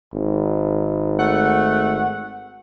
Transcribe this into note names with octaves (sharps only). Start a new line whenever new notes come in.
G#1
A3 F#5